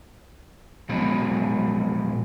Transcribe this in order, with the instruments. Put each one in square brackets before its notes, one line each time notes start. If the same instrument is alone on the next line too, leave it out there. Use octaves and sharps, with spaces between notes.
[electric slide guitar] A#2 F3 F#3 G#3 B3